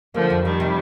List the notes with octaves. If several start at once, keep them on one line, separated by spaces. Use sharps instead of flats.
D3 F3 A#3
F2
D#3 F3 G3
C3